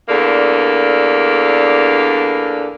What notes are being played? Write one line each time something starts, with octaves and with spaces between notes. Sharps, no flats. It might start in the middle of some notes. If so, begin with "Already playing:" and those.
E2 D3 A#3 D4